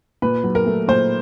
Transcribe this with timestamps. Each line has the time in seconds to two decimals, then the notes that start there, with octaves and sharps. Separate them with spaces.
0.22 A#2 B4
0.44 F#3
0.55 A#4
0.66 A3
0.88 A#2 C5